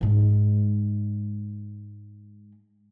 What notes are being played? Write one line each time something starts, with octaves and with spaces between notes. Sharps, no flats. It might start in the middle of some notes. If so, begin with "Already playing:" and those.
G#2 G#3